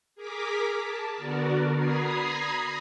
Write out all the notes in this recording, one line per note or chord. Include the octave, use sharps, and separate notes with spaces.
G#4 A#4 D6 B6
A5
D3 B3 F#4 A#4 D5
A#5 B5 D#6 G#6 A#6 C7